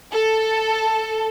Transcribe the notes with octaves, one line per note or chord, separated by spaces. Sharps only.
A4